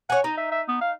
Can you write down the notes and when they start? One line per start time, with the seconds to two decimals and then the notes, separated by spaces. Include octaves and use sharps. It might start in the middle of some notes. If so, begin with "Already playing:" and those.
0.10 C#5 F#5 G#5
0.24 D#4 A#5
0.37 E5
0.52 E5
0.68 B3
0.81 F5